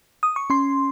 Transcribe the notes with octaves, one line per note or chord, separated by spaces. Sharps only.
D#6
C#6
C#4 C6